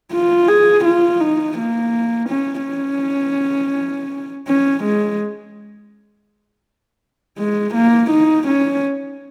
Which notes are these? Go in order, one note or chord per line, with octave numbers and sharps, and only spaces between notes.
F4
G#4
F4
D#4
A#3
C#4
C#4
C#4
G#3
G#3
A#3
D#4
C#4